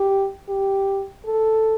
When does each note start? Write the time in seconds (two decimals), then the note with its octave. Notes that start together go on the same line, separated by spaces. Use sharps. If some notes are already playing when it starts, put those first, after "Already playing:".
Already playing: G4
0.49 G4
1.25 A4